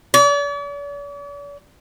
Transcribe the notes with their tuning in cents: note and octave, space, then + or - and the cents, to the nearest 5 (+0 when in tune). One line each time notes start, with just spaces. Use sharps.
D5 -45